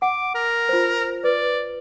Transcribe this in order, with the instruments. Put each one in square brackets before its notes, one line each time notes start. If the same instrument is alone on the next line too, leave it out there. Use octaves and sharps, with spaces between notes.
[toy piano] F#5 [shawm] D6
[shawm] A#4
[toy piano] F4 C5
[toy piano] B4 [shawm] D5